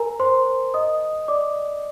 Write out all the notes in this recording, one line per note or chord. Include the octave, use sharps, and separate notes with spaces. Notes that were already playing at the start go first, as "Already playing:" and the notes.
Already playing: A#4 G#5 A#5
C5 C6
D#5 D#6
D5 D6